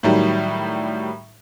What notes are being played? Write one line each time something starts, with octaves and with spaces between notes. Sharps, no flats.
A2 D#3 F#3 G3